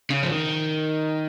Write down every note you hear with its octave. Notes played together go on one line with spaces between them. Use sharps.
C#3
F3
D#3